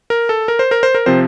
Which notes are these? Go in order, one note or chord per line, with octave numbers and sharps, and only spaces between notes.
A#4
A4
A#4
C5
A#4
C5
A#4
C3 F3 C4 C5